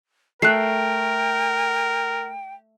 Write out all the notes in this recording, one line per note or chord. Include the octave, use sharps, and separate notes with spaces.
A3 A#4 G5 F#6 C7